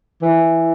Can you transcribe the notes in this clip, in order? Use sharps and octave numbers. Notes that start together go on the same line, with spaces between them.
E3